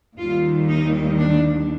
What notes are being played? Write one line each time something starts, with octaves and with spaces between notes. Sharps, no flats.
D#2 D#3 G3 F4
D#4
D4